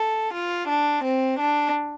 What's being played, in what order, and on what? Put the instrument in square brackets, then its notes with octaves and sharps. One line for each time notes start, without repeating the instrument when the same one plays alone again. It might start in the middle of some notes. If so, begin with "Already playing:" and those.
Already playing: [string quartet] A4
F4
D4
C4
D4